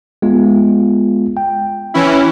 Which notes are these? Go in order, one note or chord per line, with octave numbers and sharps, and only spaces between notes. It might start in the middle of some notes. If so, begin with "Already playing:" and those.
G#3 B3 F4
G5
E3 C#4 E4